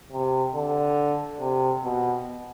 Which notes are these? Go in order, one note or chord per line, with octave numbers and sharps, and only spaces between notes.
C3
D3
C3
B2